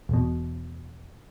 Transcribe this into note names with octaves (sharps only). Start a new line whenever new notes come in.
E1 B2